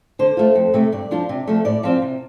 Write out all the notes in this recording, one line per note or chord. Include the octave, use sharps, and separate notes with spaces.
D3 C5
A3 F4
F2
C3 A3
G2 D5
F3 D4 F4
C3
F3 A3
A2 D5
F3 C4 F4 F5
C3